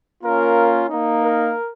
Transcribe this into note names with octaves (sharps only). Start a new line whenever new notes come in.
A#3 C#4 F4 A#4
A#3 D#4
A#4